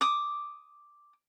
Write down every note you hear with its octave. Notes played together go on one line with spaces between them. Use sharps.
D6 D#6